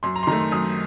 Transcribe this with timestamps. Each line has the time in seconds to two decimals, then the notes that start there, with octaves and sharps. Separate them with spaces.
0.03 F#2 C6
0.16 A#5
0.23 C6
0.27 D#3 A3 A#5
0.40 C6
0.52 F#2 D#6